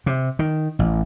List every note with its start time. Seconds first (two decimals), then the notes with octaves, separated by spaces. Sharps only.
0.06 C3
0.39 D#3
0.79 A1